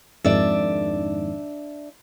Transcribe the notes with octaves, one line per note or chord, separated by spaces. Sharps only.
F2 G#2 D#3 D4 D5 E5